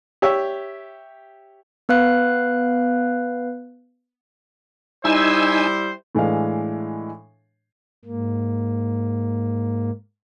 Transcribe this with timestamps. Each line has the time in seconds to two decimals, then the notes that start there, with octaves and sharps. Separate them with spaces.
0.22 G4 C#5 E5
1.89 B3 B4 F5 F#6
5.05 G3 D#4 E4 C5 G#5 E6
6.15 A2 E3 G#3 D4 F5
8.05 G#2 A#3